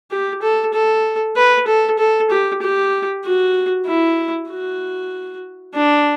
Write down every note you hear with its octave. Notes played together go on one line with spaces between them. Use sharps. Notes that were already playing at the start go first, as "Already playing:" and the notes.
G4
A4
A4
B4
A4
A4
G4
G4
F#4
E4
F#4
D4